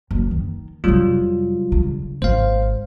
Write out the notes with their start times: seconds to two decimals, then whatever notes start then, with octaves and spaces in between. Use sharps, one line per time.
0.11 F#1
0.31 D#3
0.84 F2 C3 F#3 G3 F4
1.72 C#3 D4
2.22 G#1 C5 F5